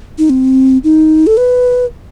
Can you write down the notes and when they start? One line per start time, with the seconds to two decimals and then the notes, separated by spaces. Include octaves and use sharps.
0.18 D#4
0.30 C4
0.84 D#4
1.27 A4
1.37 B4